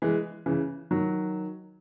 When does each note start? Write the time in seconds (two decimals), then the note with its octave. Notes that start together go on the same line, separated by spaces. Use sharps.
0.02 E3 G#3
0.46 C#3 E3
0.91 D#3 F#3